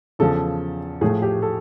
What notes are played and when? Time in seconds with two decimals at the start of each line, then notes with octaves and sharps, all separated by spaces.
0.19 E2 C#3 F3 A4
1.01 A2 F3 A3 G#4
1.22 G4
1.42 A4